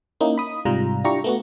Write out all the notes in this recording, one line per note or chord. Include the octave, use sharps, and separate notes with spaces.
A#3 C#4 D#4 E4
B5 D#6
G#2 C3 G3 F4 A#5
D4 E4 F4 G4 A#5 C#6
A3 B3 F#4